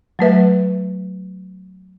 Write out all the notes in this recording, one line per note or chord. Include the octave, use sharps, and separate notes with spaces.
F#3 A3 B4 E5